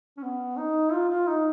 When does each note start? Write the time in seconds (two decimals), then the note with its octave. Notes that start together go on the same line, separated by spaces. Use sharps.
0.17 C#4
0.23 B3
0.57 D#4
0.92 F4
1.09 F4
1.27 D#4